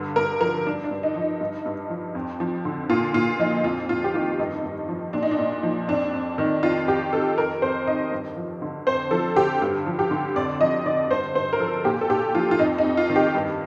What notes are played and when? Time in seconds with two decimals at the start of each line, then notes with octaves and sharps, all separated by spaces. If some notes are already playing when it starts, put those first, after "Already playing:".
Already playing: G2 D3
0.16 G2 A#4
0.41 F3 A#4
0.66 G2 D4
0.84 D4
0.91 G2
1.03 D#4
1.16 F3
1.22 D#4
1.41 G2
1.66 G2
1.90 F3
2.15 F2
2.40 F3
2.65 D3
2.90 A#2 F4
3.14 A#2 F4
3.39 F3 D#4
3.64 F2 F4
3.89 F2 F4
4.04 G4
4.14 D#3 F4
4.39 G2 D#4
4.64 G2
4.89 F3
5.13 A#2 D4
5.23 D#4
5.31 D4
5.39 A#2
5.63 F3
5.88 F2 D4
6.14 F2
6.38 D#3
6.63 F2 F4
6.88 F2 G4
7.13 D#3 A4
7.38 F2 A#4
7.62 F2 C5
7.87 D#3 D#5
8.12 G2
8.37 F3
8.62 D3
8.87 F2 C5
9.11 F3 A4
9.36 D3 G4
9.62 G2
9.86 F3
9.99 G4
10.11 D3
10.35 F2 D5
10.61 F3 D#5
10.86 D3 D5
11.10 G2 C5
11.35 G2 C5
11.53 A#4
11.60 F3 A4
11.85 A#2 G4
12.01 A4
12.09 A#2 G4
12.35 F3 F4
12.51 F4
12.59 F2 D#4
12.78 D#4
12.85 F2
12.97 F4
13.10 D#3
13.16 G4
13.35 G2